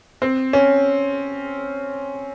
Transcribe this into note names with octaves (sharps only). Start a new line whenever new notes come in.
C4
C#4